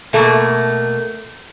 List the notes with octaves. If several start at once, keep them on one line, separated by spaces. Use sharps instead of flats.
B2 A3 A#3